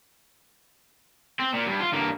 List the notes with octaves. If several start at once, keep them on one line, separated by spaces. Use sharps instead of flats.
C4
A#2
G2
F4
G2 A#3